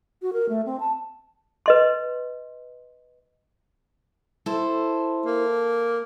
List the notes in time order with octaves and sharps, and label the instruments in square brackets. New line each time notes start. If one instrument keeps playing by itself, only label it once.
[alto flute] F#4
A#4
A3
C4
A5
[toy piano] B4 D#5 C6
[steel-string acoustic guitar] E4 C5 [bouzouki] A4
[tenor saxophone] A#3